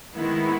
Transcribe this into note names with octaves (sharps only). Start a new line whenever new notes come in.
D#3 G#3 B3 E4